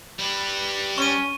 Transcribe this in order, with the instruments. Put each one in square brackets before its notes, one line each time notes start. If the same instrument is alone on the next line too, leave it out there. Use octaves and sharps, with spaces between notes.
[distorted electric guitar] G3 B4
[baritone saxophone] C#4 [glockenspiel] C#6 D#7